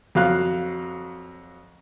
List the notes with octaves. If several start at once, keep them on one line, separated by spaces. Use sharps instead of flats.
F2 F#3 F5 F#6